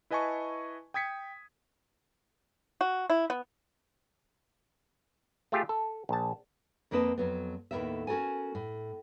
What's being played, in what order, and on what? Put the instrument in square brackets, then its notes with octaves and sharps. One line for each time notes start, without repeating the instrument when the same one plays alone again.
[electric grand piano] E4 B4 D#5 G#5 A5 C#6
G5 D#6 G#6 B6 C#7
[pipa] F#4
E4
B3
[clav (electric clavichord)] A3 F4 G4 G#4
A4
A#1 A5
[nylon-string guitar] F2 A#3 C4 B4 D#5 A5
F2 F#3 B3
D#2 A2 A3 B3 A#4 E5
C#4 F#4 A4 A#4 G#5
A2